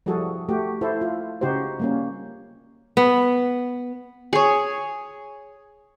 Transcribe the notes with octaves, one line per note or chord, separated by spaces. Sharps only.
F3 G3 E4 F#4 G#4 A4
A3 F#4 G4
E4 A4 C5
F4
C#3 D#4 F#4 G4 C5
G3 A#3 C#4
B3
G#4 C#5